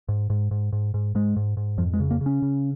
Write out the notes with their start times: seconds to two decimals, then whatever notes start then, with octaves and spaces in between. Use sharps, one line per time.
0.09 G#2
0.30 G#2
0.51 G#2
0.73 G#2
0.94 G#2
1.15 G#2 G#3
1.36 G#2
1.57 G#2
1.78 F2 F3
1.93 G#3
2.00 C#3
2.11 A#3
2.21 C#3
2.26 C#4
2.42 C#3